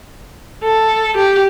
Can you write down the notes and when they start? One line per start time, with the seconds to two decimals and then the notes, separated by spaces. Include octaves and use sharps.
0.64 A4
1.17 G4